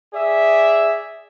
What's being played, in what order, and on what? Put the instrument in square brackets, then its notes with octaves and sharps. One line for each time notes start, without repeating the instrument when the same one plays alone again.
[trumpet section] G#4 D5 E5